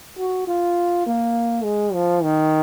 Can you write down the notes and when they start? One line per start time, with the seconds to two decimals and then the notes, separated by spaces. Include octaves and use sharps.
0.18 F#4
0.47 F4
1.07 A#3
1.64 G#3
1.94 F3
2.23 D#3